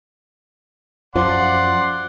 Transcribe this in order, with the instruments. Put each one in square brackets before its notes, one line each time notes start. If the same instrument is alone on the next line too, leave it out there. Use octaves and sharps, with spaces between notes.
[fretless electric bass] F#2 F3 [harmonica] D5 F#5 C6